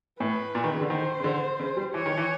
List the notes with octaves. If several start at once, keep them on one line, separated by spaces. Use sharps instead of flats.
A2 B4
A#2
D#3
C#3
D3
D#3 C5
C#3
D3
C#3
G3
E3 C#5
D#3
E3